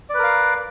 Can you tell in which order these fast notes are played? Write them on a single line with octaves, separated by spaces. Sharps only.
D5 B4 A#4 F5